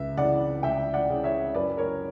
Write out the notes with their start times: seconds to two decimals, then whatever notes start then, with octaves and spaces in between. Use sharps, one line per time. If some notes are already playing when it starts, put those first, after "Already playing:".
Already playing: C#2 E5
0.17 C#3 E3 D5 F#5
0.63 C#2 E5 G5
0.94 D5 F#5
1.10 C#3 E3
1.24 C#5 E5
1.54 F#2 B4 D5
1.77 A#4 C#5